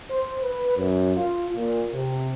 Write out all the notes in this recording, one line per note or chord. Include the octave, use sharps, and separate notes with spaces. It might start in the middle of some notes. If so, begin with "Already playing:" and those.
C5
B4
F#2
F4
A#2
C3